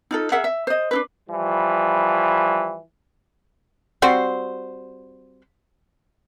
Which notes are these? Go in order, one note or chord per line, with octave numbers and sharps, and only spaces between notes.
D#4 F4 A4
G#4 A#4 E5 F#5
E5
C5 D#5
D4 D#4 B4
E3 F3 G3
G3 C4 F#4 C5